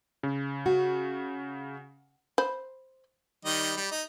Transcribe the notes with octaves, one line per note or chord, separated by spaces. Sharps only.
C#3
F#4
C5 B5
D#3 G3 D#5
G3
D#4